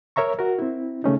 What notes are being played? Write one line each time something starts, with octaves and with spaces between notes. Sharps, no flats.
A#4 C#5 E5 A#5 C#6
F#4 A#4
C4 E4
C#3 A3 C#4 D#4